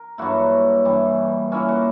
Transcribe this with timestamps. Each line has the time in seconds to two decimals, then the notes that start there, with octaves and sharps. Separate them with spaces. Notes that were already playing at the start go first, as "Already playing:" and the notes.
Already playing: A#4
0.18 G2 F#3 A#3 E4 F#4
0.85 G2 E3 G3
1.52 A#2 A#3 C#4 E4
1.69 F#4